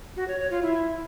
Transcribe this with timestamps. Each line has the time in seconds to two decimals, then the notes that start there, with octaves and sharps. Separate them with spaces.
0.17 F#4
0.28 C#5
0.39 C#5
0.51 F4
0.62 E4